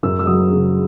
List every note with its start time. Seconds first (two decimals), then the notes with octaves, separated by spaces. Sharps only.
0.03 F#2 E6
0.19 E6
0.27 F#3 D#6
0.52 C#3